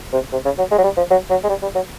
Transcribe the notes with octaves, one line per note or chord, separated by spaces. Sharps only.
C3
C3
C#3
F#3
G#3
F#3
G3
F3
F#3
F#3
G#3
G3
G3
F#3